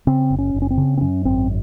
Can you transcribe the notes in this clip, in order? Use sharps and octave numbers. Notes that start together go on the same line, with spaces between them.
C#3 C4
F#1
C#4
F#1
C#4
C4
C#3
C4
F#2 C#4
G#1 C4